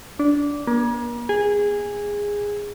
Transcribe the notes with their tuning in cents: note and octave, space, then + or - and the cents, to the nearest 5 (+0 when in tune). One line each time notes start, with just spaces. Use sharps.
D4 -15
A#3 +40
G#4 -15